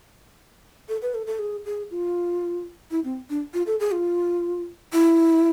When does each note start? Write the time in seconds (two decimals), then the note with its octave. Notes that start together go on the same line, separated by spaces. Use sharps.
0.89 A4
1.02 B4
1.14 A4
1.27 A4
1.39 G#4
1.65 G#4
1.91 F4
2.91 E4
3.04 C4
3.30 D4
3.54 F4
3.67 A4
3.80 G#4
3.92 F4
4.93 E4